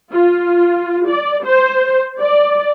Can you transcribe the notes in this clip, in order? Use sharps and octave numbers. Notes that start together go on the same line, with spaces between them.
F4
D5
C5
D5